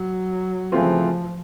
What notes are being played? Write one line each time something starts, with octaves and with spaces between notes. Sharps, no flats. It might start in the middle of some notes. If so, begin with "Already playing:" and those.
Already playing: F#3
C#3 E3 F3 A3 C4 F4